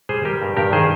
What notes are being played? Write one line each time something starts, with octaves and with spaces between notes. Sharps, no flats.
G3 G#4 C5
G3 G4 A#4
G2
G2 G4 A#4
D#3 G#4 C5